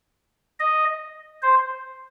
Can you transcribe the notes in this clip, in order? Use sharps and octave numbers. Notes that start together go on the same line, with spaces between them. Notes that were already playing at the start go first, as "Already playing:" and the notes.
D#5
C5